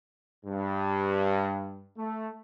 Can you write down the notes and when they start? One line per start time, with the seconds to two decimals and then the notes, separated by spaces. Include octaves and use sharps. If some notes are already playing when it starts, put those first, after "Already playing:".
0.45 G2
1.97 A3